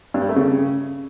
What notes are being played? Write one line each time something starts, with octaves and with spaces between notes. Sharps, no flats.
G2
G3
A3
C#3